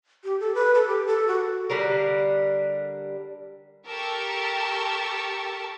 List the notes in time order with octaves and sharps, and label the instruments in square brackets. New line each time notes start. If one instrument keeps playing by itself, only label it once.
[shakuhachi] G4
A4
B4
A4
G4
A4
F#4
[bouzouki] D3 G3 D4 A#4
[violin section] G4 A4 A#4 A5 C#6 E6